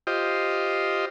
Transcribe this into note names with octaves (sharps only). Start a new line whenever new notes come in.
F4 G4 C5 D#5